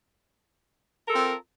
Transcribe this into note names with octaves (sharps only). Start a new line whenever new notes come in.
C4 F4 A4 A#4